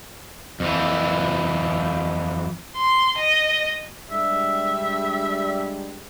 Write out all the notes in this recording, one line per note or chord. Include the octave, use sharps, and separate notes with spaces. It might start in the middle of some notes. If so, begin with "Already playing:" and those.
F2 E3
C6
D#5
G3 G#3 D4 E5